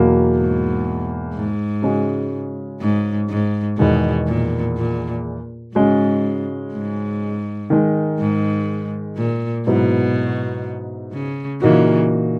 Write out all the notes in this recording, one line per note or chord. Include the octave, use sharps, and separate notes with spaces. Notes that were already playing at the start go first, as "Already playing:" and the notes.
Already playing: E2 B2 F#3 A#3
G#2
G#2
C#3 G#3 C#4 F#4
G#2
G#2
E2 B2 D#3 G#3
A#2
A#2
G#2 C#3 G#3 C#4 F#4
G#2
D#3 G#3 D#4
G#2
A#2
G#2 B2 F#3 B3 E4
C#3
A#2 C#3 E3 A#3 D#4 F#4